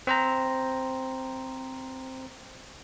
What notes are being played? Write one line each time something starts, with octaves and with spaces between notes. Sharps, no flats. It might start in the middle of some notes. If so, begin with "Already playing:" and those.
C4 C5 A#5